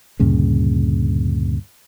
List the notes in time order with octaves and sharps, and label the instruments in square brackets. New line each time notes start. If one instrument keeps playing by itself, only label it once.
[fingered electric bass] D2 G2 A#2 C#3